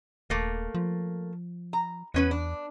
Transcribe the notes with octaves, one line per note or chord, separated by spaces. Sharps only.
D#1 A3 A#3
F3
A#5
E2 B3 C#4 B4
D4